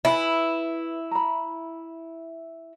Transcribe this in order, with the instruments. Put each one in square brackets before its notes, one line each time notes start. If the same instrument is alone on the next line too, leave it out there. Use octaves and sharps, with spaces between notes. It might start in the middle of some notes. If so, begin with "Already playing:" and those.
[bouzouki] E4 [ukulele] B4 G#5 B5
[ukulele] A#5 B5